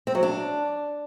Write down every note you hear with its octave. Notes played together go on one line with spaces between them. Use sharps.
C4
F#3
D4